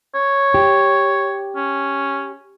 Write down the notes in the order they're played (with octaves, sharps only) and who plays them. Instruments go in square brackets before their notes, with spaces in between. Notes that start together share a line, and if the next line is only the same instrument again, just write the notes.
[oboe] C#5
[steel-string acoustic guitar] G4
[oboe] C#4